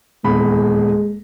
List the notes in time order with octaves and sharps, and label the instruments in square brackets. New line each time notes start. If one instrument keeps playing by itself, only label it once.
[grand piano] D#1 E2 B5 [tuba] G#3